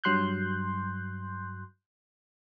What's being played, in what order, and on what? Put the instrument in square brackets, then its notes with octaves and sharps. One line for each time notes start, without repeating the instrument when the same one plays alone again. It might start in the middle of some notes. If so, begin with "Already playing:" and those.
[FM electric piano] G2 F#3 C6 F#6 G6